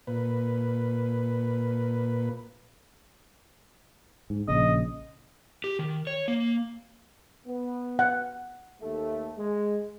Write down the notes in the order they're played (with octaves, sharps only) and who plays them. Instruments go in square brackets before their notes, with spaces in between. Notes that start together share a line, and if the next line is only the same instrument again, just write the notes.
[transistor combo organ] A#2 B4
[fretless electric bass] G#2
[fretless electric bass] A#1 C#3 [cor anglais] D#5
[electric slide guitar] G4
D#3
C#5
A#3
[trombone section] B3
[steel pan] F#5
[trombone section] D#2 A3
G#3